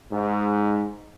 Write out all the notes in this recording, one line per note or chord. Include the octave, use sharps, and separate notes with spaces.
G#2